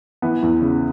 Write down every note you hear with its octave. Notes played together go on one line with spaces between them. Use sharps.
E3 B3
E2
C#3